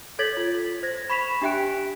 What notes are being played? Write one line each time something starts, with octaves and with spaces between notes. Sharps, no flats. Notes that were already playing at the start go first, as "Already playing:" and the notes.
A4 C#5 G#6 A6 B6 F#7
F4
C5 G#6 A#6
B5 C#6 B6 E7 F7
D4 G4 E5 G5 F#6 D7